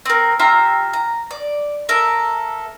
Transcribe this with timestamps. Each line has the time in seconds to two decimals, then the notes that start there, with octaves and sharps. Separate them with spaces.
0.05 C4 A#4
0.39 F4 G4 E5 A#5
0.93 A#5
1.31 D5
1.89 A4 A#4 E5